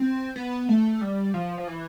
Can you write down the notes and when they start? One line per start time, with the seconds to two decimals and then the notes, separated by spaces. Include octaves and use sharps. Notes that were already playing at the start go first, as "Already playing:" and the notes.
Already playing: C4
0.36 B3
0.69 A3
1.01 G3
1.34 F3
1.58 F3
1.68 E3